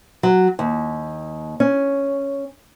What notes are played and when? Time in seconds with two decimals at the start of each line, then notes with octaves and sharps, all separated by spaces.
0.23 F#3
0.59 D#2
1.60 C#4